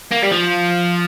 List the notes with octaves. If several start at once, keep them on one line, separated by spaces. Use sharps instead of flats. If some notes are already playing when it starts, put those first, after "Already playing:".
A#3
G3
F3